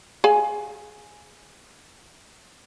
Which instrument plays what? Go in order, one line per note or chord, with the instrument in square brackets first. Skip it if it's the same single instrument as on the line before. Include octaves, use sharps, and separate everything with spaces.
[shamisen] G#4 F5 G#5